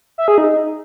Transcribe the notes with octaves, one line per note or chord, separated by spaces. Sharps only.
E5
G#4
D#4